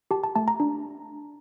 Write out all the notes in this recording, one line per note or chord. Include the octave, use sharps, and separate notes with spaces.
G4 A5
A5
A3 A5
A#5
D4